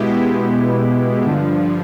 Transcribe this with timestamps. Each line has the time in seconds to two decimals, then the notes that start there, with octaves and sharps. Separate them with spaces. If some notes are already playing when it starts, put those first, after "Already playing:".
Already playing: B2 G#3 B3 E4 G4
1.24 G2 D3 F3